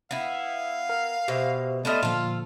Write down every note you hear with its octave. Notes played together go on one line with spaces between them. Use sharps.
B3 E4 F5
A#4
B2 G4 C5 E5
A3 B3 C5 D5 D#5 F6 A6
A#2 D3 F3 F4 A4 F5